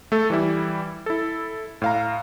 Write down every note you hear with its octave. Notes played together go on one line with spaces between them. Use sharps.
A3 A4
E3 G3 E4
E4 A4
A2 F5 A#5